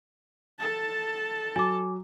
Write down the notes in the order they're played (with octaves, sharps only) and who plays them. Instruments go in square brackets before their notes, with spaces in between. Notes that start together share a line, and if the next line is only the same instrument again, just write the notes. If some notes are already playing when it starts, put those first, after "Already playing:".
[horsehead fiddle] A4 A5
[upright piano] F#3 [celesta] G#5 D6